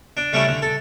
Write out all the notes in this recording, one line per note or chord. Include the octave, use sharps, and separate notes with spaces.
D4
G3 A3 C#4 D4 E4
D3
A4